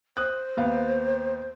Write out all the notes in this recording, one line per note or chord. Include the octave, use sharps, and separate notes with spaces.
C5 D#6 F#6
D#2 B3 F5